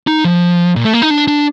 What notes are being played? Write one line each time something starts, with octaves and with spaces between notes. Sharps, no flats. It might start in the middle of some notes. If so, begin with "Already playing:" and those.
D#4
F3
A#2
A3
A#3
D#4
D4
D4